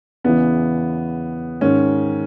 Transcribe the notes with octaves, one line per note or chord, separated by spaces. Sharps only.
E2 C#3 E3 B3
G#2 D#3 C#4